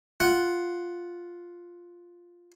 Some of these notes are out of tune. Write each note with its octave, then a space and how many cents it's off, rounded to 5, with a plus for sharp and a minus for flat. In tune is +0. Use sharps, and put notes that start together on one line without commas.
F4 +0 F#5 +0